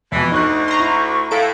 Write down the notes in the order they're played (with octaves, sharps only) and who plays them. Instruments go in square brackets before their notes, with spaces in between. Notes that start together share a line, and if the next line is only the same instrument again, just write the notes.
[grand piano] F2 B2 [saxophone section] E3
[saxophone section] D2 [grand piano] D#4 F#6 [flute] C#6
[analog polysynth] A#5 C6
[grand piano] E4
[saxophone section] A2 [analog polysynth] A4 D7 [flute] F5